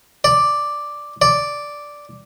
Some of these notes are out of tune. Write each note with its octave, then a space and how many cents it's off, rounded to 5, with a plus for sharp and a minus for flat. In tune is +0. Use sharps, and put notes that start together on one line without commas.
D5 +0
D5 -5